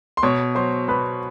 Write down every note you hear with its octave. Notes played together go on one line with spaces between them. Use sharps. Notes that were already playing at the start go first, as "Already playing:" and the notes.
C6
B2 C#5 C#6
F#3 C5 C6
B2 B4 B5